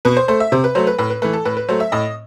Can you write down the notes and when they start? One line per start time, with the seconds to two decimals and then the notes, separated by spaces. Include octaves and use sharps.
0.05 B2 B4
0.17 C5
0.28 A3 C5
0.40 E5
0.52 C3 C5
0.64 B4
0.75 F#3 A3 C5
0.87 B4
0.98 A2 B4
1.10 B4
1.22 E3 A3 B4
1.33 A4
1.45 A2 B4
1.57 B4
1.68 F#3 A3 C5
1.80 E5
1.92 A2 D#5